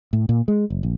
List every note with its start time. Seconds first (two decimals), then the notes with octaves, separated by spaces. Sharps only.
0.13 A2
0.29 A#2
0.48 G#3
0.70 F#1
0.83 A#1